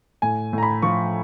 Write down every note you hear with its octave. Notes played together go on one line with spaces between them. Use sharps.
A2 G#5
A2 A#5
B5
F3 C#6